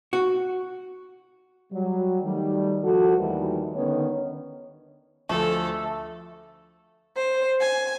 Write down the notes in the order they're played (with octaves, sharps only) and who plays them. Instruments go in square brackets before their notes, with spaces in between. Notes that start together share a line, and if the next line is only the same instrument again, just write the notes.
[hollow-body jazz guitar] F#4
[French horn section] F#3 G3
D#3 G3 A3
F3 F#4 A4
D#2 D#3 E3 G3 A3 A#4
D3 D#3 B3 C#4 C#5
[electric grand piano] D2 F3 [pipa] A3 [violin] A4
[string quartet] C5
G#5